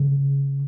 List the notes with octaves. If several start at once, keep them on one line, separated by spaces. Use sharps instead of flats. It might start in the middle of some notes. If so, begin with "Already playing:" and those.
Already playing: C#3